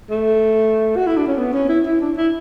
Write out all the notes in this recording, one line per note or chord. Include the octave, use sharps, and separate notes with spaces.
A3
F#4
E4
D4
C#4
B3
C#4
E4
E4
D4
E4